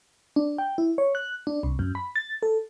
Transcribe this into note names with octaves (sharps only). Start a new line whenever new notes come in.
D4
G5
E4
C#5
F#6
D4
C2
F#2
B5
A6
A4